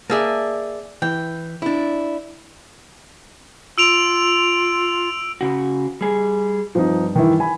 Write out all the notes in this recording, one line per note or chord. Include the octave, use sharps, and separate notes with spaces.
A#3 G#4 D5 E5 A5
E3 G5
D4 E4
F4 E6 D7 F7
C#3 F#4
G3 G#4
G2 F3 C4 D#4
D#3 E3 E4
G#5 B5